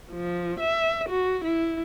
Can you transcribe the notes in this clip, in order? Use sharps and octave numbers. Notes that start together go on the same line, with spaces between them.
F3
E5
F#4
E4